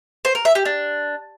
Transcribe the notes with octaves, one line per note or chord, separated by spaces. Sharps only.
C5
A#4
E5
G4
D4